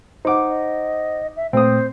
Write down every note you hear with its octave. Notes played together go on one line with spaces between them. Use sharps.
D#4 C5 F#5 D6
D#5
E5
A#2 A3 C4 C5 D#6